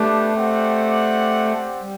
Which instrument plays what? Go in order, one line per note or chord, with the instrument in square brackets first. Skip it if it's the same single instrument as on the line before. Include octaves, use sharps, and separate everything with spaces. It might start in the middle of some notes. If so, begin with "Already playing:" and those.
Already playing: [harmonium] A3 [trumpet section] B3 D4 G4
[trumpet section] C4 G4 D5 F#5
[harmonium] G3